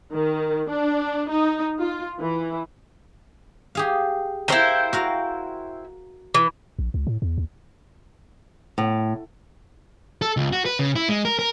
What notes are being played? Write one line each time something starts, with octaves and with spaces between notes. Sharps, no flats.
D#3
D4
D#4
F4
E3
G4 G#4 F5
E4 A#4 C5 E5 F5 G5
F#4 A#4 F5
E3
A#1
C#2
A2
E2
D#2
A2
A4
C#2
F#4
B4
C#3
E4
G#3
A#4
A#4